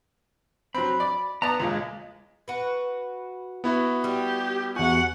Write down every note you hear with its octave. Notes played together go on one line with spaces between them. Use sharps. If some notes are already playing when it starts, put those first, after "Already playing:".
F#3 C4 B5
D5
B3 D5 A5 A#5 D#6
D#2 A#2 C#3 G#3
F#4 B4
B3 E4 F#4
G3 G4
E2 F#4 F#5 G#5